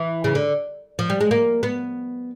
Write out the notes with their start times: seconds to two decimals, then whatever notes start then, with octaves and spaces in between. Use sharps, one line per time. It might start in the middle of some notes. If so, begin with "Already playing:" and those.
Already playing: E3
0.24 C#3
0.35 D3
0.99 F3
1.10 G3
1.21 G#3
1.31 A#3
1.63 B3